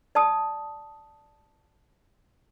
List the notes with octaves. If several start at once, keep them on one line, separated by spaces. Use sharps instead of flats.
D5 A5 D#6